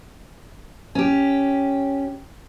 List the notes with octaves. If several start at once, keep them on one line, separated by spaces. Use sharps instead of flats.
C#4 G4